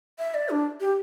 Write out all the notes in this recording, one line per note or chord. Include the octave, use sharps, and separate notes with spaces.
E5
D5
D4
G4